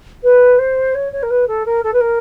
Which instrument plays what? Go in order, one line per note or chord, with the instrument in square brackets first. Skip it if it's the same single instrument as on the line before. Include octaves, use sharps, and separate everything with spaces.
[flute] B4
C5
C#5
C#5
A#4
B4
A4
A#4
A4
B4
A#4